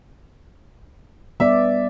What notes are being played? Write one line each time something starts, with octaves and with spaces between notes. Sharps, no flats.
G3 B3 D5 E5